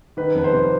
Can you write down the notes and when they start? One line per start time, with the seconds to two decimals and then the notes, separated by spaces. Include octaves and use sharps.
0.17 D#3 B4
0.35 F2 B4
0.44 C5
0.53 C3